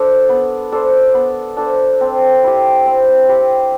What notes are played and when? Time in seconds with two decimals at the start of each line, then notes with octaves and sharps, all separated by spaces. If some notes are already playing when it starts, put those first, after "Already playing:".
Already playing: D4 A4 C5
0.29 B3
0.72 D4 A4 C5
1.14 B3
1.57 D4 A4 C5
2.01 C4
2.43 E4 G4
2.86 C4
3.29 E4 G4